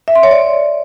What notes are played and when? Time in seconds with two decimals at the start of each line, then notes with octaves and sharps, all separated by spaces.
0.08 E5
0.16 C6
0.23 C#5
0.31 D5